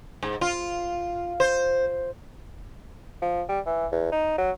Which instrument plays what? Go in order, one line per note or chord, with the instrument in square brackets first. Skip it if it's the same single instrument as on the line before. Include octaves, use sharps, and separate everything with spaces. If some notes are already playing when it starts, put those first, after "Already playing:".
[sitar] G#2
F4
C5
[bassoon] F3
G3
E3
E2
D#4
F#3